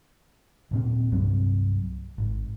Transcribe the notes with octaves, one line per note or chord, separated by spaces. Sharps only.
D#1 A#2 C4
C2 G2 F#3 C4
G#1